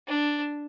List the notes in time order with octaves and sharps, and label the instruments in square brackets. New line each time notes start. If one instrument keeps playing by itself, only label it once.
[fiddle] D4